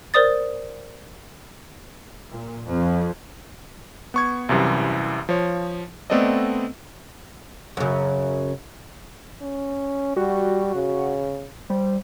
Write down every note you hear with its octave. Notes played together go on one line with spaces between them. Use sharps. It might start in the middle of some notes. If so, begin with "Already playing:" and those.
A#4 C5 D5 D#6 A6
A#2
F2
B3 C#6 G#6
C2 F#2 C3 E3
F3 C#5
A3 B3 C4 A4 D5 D#5
F#2 C#3
C#4
G3 F#4
C#3
G3 C5